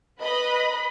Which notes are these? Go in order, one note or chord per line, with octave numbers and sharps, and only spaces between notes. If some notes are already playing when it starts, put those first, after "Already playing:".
B4 D#5 B5